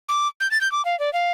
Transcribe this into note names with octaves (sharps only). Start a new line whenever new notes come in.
D6
G6
A6
G6
D6
F5
D5
F5